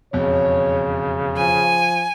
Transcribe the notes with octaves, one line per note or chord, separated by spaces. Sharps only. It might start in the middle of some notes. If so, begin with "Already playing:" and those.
E1 F2 C#3 C#5
F3 G#5